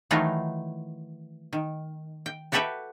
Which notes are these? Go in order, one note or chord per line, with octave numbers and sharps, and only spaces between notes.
D#3 E3 F#3 A3 D#4 F4
D#3
G5
F#4 G4 A4 B4 E5 G5